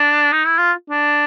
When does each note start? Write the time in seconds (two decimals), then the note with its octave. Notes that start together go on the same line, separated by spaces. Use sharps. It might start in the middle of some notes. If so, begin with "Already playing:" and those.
Already playing: D4
0.33 D#4
0.46 E4
0.58 F4
0.90 D4